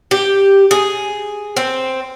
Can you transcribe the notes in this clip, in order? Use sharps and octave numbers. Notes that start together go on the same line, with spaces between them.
G4
G#4
C4